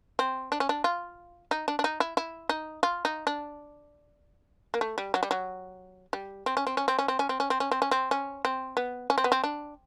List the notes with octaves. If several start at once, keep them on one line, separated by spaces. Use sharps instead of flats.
C4
D4
C#4
D4
F4
D#4
D4
D4
D#4
E4
E4
D#4
F4
D#4
D4
A#3
A3
G3
F#3
G3
F#3
G3
C4
C#4
C4
C#4
C4
C#4
C4
C#4
C4
C#4
C4
C#4
C4
C#4
C4
C#4
C4
B3
C#4
C4
B3
C4
D4